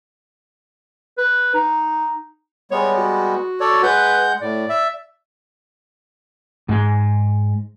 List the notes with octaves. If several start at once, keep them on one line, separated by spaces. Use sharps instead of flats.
B4
D#4
G3 G#3 B3 C#5
F#4
A4 C#5 D5
G#3 B4 F#5 G6
A2 D5
E5
G#2 G#3